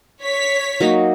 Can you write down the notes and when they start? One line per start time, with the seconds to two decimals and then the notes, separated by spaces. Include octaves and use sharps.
0.23 C#5 B6
0.81 F#3 A#3 D#4